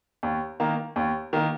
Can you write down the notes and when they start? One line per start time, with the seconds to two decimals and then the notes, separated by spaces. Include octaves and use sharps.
0.23 D#2
0.60 D#3 A#3
0.96 D#2
1.33 D#3 A#3